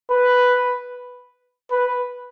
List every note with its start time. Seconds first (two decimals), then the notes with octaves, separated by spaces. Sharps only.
0.11 B4
1.71 B4